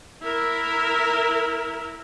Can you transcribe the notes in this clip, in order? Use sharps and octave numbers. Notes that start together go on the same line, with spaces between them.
E4 A#4